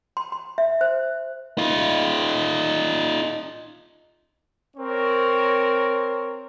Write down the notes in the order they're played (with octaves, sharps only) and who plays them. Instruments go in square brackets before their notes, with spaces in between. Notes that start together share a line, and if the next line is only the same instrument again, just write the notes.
[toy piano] C6
C6
E5
C5
[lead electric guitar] D#4 F4
[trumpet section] C4 A#4 C#5